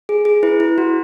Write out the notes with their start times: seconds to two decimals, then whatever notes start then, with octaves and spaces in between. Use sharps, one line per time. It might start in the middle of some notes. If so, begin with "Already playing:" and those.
0.09 G#4
0.25 G#4
0.43 E4 B4
0.60 E4
0.78 F#4